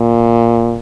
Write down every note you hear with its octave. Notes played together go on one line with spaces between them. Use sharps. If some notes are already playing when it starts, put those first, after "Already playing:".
Already playing: A#2